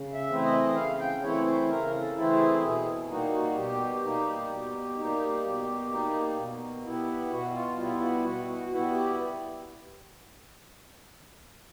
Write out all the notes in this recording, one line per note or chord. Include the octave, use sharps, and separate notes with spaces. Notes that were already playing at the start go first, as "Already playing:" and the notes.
Already playing: C#3
E5
E3 A3 C4 E4
D#5
C#3 F5
G5
E3 A3 C4 E4 C#5
C5
C#3 A#4
A4
E3 A3 C4 E4
G#4
B2 G#4
G3 A#3 D#4 F#4
F#4
B2 G4
G3 A#3 D#4
B2
G3 A#3 D#4
B2
G3 A#3 D#4
B2
G3 B3 E4
B2 F#4
F4
G3 B3 E4 F4
F#4
B2 F#4
F#4
G3 B3 E4 F#4
G4